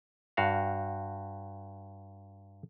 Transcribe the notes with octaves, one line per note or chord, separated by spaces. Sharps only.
G2 F#4 F5